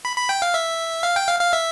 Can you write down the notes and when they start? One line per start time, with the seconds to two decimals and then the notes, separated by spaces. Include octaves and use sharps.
0.05 B5
0.17 B5
0.29 G5
0.42 F5
0.54 E5
1.03 F5
1.16 G5
1.28 F5
1.40 F5
1.53 E5